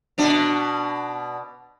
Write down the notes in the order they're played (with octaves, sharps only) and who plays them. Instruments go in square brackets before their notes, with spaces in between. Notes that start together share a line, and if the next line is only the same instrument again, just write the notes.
[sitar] B2 D4